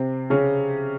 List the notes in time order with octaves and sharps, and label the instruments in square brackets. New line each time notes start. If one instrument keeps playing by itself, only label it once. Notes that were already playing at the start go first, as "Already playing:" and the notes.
Already playing: [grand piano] C3 C4
C#3 C#4